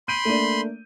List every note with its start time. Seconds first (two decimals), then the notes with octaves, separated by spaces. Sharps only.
0.08 B5 C6 G6 D7 D#7
0.25 A3 A#3 D4